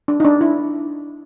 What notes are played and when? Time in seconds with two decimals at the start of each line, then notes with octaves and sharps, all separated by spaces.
0.08 D4
0.20 D#4
0.25 D4
0.41 E4